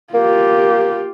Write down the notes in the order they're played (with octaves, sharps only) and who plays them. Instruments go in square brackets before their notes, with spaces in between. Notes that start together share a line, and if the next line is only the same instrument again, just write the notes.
[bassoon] A#3 [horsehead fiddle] F4 G4